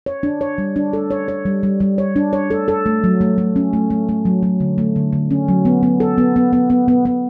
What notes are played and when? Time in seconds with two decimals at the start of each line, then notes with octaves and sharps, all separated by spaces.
0.06 C#5
0.23 D4
0.41 C#5
0.58 G3
0.76 D4
0.93 A4
1.11 C#5
1.28 C#5
1.46 G3
1.63 G3
1.80 G3
1.98 C#5
2.16 D4
2.33 C#5
2.50 A4
2.68 A4
2.86 A3
3.04 F#3
3.21 A3
3.38 A3
3.56 C#4
3.73 A3
3.90 A3
4.09 A3
4.25 F#3
4.43 F#3
4.60 D3
4.78 A3
4.96 D3
5.13 D3
5.31 C#4
5.48 F#3
5.65 B3
5.83 B3
6.00 A4
6.18 B3
6.36 B3
6.53 B3
6.70 B3
6.88 B3
7.05 B3